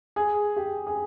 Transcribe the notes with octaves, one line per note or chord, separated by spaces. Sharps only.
G#4
G4
G#4